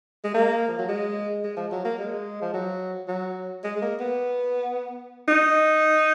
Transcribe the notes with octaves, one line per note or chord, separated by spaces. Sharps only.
G#3
A#3
F3
F#3
G#3
G#3
F3
F#3
A#3
G#3
F3
F#3
F#3
G#3
G#3
A#3
B3
D#4